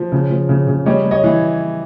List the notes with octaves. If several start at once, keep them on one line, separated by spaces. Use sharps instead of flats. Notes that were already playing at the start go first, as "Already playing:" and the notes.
Already playing: F3
C#3
F3
C#3
C#3
G3 C#5 D#5
G3
C#5 D#5
E3